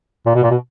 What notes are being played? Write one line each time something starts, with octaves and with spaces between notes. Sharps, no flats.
A#2
B2
A#2
B2